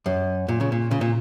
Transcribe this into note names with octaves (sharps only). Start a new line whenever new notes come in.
F#2
A#2
C#3
A#2
C#3
A#2